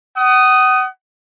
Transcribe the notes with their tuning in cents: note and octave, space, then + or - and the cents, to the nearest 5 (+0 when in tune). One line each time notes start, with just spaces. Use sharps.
F#5 +35 D#6 +0